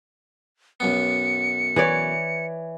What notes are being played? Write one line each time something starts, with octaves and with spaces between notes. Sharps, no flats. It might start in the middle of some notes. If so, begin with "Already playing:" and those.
B1 F#2 B3 C#7
E3 C#5 D5